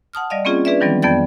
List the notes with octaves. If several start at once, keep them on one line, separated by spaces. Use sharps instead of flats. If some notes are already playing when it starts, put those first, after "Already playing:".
F#5 A5 D#6 F6
G3 D5 D#5 F5
A#3 C4 C#4 F4 G#4
D4 G#4 B4 D5 E5
D#3 E3 F#3 G3 B3 C4
F2 B3 D5 G5 G6 A6